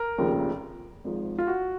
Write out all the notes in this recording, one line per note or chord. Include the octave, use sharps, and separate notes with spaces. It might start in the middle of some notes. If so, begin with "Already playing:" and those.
Already playing: A#4
F1 D#2 C#3 F3
G#1 G#2 F3
F4
F#4